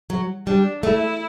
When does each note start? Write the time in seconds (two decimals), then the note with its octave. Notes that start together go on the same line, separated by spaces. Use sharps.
0.10 F#3
0.47 G3 D4
0.83 A3 E4